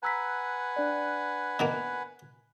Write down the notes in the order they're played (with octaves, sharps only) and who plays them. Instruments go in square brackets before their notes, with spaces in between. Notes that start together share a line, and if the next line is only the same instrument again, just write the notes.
[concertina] B4 F#5 G#5 [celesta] A#5 E6 B6
[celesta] D4 D5
[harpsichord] B2 D#3 A#3